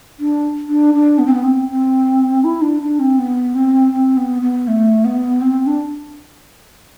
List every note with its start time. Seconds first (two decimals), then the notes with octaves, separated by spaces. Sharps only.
0.19 D4
0.68 D4
0.94 D4
1.18 B3
1.26 C4
1.33 B3
1.44 C4
1.68 C4
2.44 E4
2.61 D4
2.81 D4
2.99 C4
3.19 B3
3.55 C4
3.93 C4
4.17 B3
4.42 B3
4.67 A3
5.05 B3
5.41 C4
5.66 D4